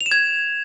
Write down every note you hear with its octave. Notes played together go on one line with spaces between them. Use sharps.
F7
E7
G#6